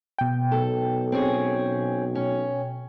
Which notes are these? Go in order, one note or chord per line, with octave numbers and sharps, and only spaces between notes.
B2 G5
B1 A4
C4 C#4 G#4
C#4